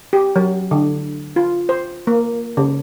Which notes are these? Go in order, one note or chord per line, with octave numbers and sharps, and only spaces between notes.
G4
F#3
D3
F4
C5
A#3
C#3